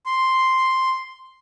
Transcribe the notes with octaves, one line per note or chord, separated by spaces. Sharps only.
C6